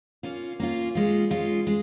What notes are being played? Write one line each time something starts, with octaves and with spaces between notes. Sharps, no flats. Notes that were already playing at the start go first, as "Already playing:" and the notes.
A#3 C#4 F4
A#3 C#4 F4
G#3 C#4 F4
G#3 C#4 F4
G#3